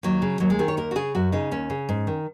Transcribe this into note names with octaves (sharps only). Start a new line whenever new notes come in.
D#2 F#3
C#3
D#2 F#3
G#3
D#3 G#4
C#5
D#2 A#4
F#4
C#3 G#4
F#2 F#4
C#3 D#4
D#2 C#4
C#3
G#2
D#3